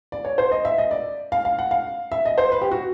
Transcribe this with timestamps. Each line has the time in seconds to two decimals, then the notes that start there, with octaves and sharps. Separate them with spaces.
0.12 D5
0.25 C#5
0.38 C5
0.51 D#5
0.65 E5
0.78 D#5
0.91 D5
1.32 F5
1.45 F5
1.59 F#5
1.71 F5
2.12 E5
2.25 D#5
2.38 C5
2.52 B4
2.62 G4
2.72 F#4